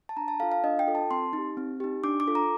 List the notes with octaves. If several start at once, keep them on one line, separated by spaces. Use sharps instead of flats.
A5
D4 A#5
A5
F4 A4 F5
F5
D4 D#5
G5
F4 A4
A5
C4 C6
D#4 G4
C4
D#4 G4
D4 D6
D6
F4 A4
A#5